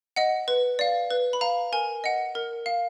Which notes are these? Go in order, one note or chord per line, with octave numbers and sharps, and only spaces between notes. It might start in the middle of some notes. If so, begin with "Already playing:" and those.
D#5 F#5
B4
D5 F5
B4
B5
F5 A#5
A#4 G#5
D#5 F#5
A#4
F5